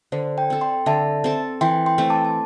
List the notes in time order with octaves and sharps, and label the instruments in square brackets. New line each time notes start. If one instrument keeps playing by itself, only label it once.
[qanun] D3 [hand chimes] C5
[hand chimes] D5 G5
[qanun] C4 A4
[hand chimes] G5 C6
[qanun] D3 [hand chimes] E5 A5
[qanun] C4 A4
[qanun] E3 [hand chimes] G5 C6
[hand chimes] G5 C6
[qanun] A3 C4
[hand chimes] A5 D6
A5